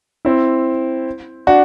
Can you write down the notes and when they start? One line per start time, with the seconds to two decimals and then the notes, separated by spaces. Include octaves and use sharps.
0.25 C4 E4
1.47 D4 F#4